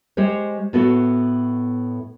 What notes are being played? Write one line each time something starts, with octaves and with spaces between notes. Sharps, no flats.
G#3 G4 C5 C#5
A2 B3 F#4 A4